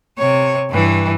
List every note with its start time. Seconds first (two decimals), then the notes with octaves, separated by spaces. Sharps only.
0.18 C3 C#5
0.70 G2 E3